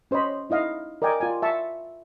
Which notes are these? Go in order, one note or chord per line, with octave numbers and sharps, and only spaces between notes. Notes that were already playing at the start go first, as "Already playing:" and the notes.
C#4 C5 C#5 D#5 B5
D#4 E4 D#5 F5
A#4 D5 D#5 G5 G#5 D6
F4 D5 G#5
E5 A5 C#6